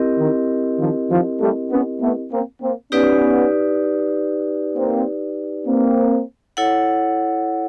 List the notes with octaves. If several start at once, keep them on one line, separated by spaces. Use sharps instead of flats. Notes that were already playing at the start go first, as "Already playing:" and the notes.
Already playing: C4 E4 G4 A#4 D#5
D#3
D#3 F3
D#3 F3
G3 A3
B3 C#4
A3 B3
A#3 C4
A#3 C4
B3 C#4 D#4 G4 B4 D5
A#3 C4
A#3 C4
E4 A4 C#5 F#5